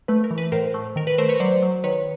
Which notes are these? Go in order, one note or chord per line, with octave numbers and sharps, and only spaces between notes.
A3 B4
A#4
E3
B4
A2 A#4 C5
A3
D#3 A#4
B4
A3 A#4 C5
B4 C#5
F#3 C5 D5
F#3
D#3 B4 C#5